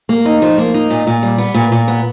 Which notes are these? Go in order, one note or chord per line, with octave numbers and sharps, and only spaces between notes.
A#3
D#4
F3
A#3
D#4
A#2
A#2
G3
B3
A#2
A#2
B3